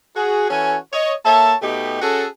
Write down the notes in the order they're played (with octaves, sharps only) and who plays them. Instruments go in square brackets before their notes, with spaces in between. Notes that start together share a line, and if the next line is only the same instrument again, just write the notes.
[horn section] F#4 G#4
E3 C#4 F#4 A4 G#5
C#5 D#5
A#3 A4 C#5 E5 A5
B2 A3 D#4 G4
C#4 F#4 G#4 A4